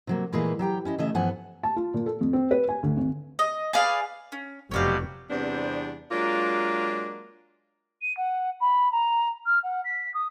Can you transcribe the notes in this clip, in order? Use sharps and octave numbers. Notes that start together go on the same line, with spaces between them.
C3 F#3 A#3
A#2 E3 G#3 A#3 G#4 B4
F#3 G4 G5 A#5
C#4 E4 D#5
C#3 E3 A3 C#4 D#5 E5
G2 E3 F3 B3 F#5 G#5
A5
F4
A#2
A4
F2
C4
B4
G#5
D2
G#1
D#5
G#4 B4 D5 F5
C#4
F1 B2 F#3 G4 C#5 D5 F5
E2 C3 G3 B3 C4 D4
F#3 G#3 A#3 D4 F4
D#7
F#5
B5
A#5
F6
F#5
B6
D#6